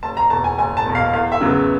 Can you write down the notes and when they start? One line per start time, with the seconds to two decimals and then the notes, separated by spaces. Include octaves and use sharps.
0.03 F#1 A5
0.17 A#5
0.30 E2 B2 A5
0.44 G#5
0.58 F#1 G#5
0.77 A5
0.86 E2 B2
0.95 F5
1.13 E2 F5
1.32 E5
1.41 C#3 F#3 B3